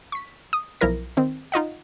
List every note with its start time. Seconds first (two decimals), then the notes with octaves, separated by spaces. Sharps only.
0.12 C#6 B6
0.53 D#6
0.81 B1 F3 E4 A#4 A#6
1.17 D#3 C4
1.52 D#4 F4 D#5 F#5